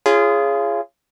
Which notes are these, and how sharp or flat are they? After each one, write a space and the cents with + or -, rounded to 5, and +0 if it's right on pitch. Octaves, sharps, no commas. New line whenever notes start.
C#4 +0 F4 -25 G#4 +0